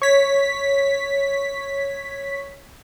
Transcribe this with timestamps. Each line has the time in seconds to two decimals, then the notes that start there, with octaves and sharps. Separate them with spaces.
0.02 C#5 B6